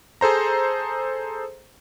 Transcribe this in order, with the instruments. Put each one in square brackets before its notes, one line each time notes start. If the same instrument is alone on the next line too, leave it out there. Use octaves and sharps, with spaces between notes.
[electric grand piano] G#4 A4 C5 A#5